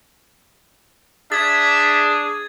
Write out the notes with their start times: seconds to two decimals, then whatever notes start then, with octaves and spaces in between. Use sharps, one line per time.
1.32 D4 G#4 E5 G#6 A6